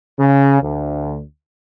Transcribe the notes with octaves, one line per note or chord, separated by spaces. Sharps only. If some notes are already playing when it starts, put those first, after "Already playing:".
C#3
D2